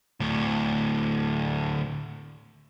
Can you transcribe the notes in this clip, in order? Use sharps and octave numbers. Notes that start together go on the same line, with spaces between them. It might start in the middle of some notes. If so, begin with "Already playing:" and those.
D2 A2